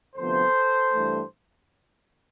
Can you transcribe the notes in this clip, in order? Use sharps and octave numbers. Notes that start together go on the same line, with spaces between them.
D2 C3 F3 B3 A4 C5
G2 E3 A3